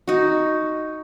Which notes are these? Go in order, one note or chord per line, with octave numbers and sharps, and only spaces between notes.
D#4 F#4